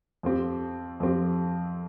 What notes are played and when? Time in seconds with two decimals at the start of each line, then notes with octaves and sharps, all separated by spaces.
0.23 F2 F3 C4 G4
1.00 F2 F3 C4 G4